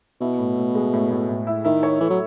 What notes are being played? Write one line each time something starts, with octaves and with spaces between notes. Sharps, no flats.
B2 E4
A2
A2
G#3
A2
A2
A2
E4
D#3 E4
C#5
E3 A3
F#3